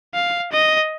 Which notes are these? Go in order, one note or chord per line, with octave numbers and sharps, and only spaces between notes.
F5
D#5